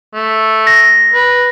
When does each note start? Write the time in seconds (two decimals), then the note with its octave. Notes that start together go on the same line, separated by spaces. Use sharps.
0.15 A3
0.67 A#6
1.14 B4